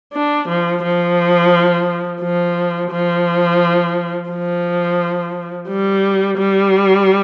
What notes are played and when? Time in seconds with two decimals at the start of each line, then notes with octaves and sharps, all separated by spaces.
0.14 D4
0.49 F3
0.83 F3
2.22 F3
2.91 F3
4.30 F3
5.68 G3
6.38 G3